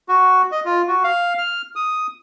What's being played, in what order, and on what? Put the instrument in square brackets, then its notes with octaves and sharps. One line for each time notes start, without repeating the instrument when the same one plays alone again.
[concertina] F#4
D#5
F4
F#4
F5
F6
D#6